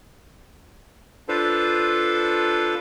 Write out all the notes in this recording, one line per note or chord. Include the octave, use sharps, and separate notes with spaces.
D4 F4 A4 B4 C5 F5